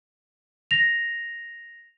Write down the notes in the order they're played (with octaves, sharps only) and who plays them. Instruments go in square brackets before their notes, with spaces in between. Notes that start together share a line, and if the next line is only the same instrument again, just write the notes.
[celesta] A#6 F7